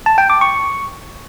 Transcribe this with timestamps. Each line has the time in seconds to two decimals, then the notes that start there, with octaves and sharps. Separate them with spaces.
0.06 A5
0.18 G5
0.30 D6
0.41 C#6